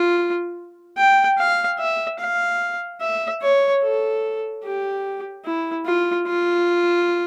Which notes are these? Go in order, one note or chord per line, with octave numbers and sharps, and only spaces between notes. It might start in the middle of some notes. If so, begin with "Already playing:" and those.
Already playing: F4
G5
F5
E5
F5
E5
C#5
A4
G4
E4
F4
F4